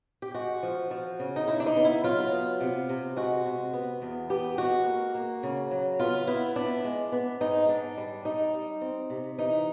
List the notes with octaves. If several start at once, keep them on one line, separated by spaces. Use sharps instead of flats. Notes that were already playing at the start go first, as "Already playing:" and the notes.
G4
G#3 F#4
F3
F3
C#3
D#4
C#3 E4
D4
D#4
B3
E4
F#3 F4
B3
C3
C3
G#3 F#4
C3
B3
E2
B3 G4
G#3 F#4
A#3
A#3
C#3
F#3
B3 F4
B3 E4
B3 D4
G#3
B3
G#2 D#4
G#2 D4
G3
G3 D#4
G3
C4
C3
E3 D#4